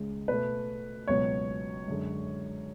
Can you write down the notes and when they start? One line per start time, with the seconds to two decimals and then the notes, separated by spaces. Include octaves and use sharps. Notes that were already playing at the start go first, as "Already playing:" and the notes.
Already playing: C#2 C#3 G#3
0.28 B2 A3 B4
1.08 C#2 B2 F#3 B3 C#5
1.88 F#2 D3 G#3